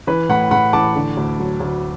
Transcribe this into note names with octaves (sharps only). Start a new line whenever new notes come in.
E3 B4
A2 F#5 B5
A2 F#5 B5
E3 A5 D6
D3
D2
F#3
D2